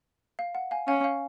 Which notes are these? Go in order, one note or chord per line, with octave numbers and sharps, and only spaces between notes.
F5
F#5
F5 G#5
C#4 F5 G#5
F5